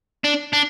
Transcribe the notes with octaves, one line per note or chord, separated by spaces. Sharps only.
D4
D4